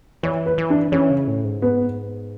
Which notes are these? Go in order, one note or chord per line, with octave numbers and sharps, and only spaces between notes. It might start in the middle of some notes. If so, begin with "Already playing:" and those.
E3 C#5
B4
E3
D4
E3 C#4
C#3
A2
G#2
B3